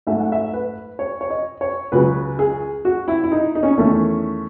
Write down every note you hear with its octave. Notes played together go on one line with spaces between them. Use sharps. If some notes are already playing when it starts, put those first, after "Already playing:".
G#2 F#3 A3 E5
F#5
E5
B4
C#5
C#5
D#5
C#5
C#2 C#3 F#3 B4
G#4
F#4
E4
E4
D#4
D#4
C#4
E2 D#3 A3 C#4